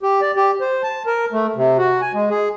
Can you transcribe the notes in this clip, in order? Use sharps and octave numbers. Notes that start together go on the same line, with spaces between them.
G4
D5
G4
C5
A5
A#4
A3
C3
F#4
G#5
G#3
G#4